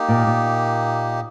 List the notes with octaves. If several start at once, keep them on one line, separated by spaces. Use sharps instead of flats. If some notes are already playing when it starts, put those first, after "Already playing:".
Already playing: A#3 D#4 G4
A#2
A#2